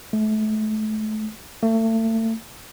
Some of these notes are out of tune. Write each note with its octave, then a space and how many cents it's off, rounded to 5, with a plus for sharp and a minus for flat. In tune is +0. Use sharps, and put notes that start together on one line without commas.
A3 -30
A3 +35